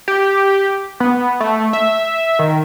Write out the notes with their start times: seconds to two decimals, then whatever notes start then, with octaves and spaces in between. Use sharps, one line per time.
0.08 G4
1.00 B3
1.40 A3
1.73 E5
2.39 D#3